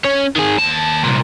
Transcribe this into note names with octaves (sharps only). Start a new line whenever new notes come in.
C#4 C#5
D#3 G#4
D#2 A5
C2 A#2